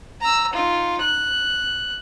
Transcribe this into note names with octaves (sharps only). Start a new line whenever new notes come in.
A#5 E6
D#4 F4
F#6